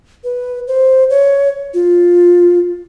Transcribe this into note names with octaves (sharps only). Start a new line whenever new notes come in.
B4
C5
C#5
F4